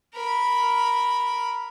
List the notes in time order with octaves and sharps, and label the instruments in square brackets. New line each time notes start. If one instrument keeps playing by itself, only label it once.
[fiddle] A#4 B5